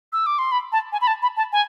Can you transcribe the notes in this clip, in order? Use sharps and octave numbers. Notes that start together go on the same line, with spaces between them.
E6
D6
C6
B5
A5
G#5
B5
A5
B5
A5
G#5